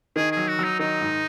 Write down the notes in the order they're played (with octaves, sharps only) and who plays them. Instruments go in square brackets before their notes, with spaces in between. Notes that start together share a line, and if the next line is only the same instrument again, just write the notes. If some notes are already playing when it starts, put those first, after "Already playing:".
[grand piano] D#3 [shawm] G#4
[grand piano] F#3 [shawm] G#4
[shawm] F#4
[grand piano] F#3
[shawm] D#4
[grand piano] D#3 [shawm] D#4
[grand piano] G#2